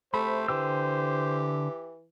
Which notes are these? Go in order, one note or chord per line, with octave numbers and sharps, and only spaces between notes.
C3 A3 C5 B5
D3 E3 G4 G5 E6